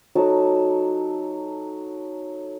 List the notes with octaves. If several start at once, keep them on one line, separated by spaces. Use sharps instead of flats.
F#3 D#4 A4 A5